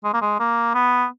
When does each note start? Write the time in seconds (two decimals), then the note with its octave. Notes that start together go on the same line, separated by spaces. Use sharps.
0.04 G#3
0.14 A#3
0.21 G#3
0.40 A#3
0.74 B3